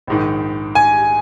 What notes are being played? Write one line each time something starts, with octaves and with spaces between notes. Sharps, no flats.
A#1 G#2 D#3
G#5